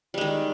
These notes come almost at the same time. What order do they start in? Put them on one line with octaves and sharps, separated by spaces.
G3 G#3 D#3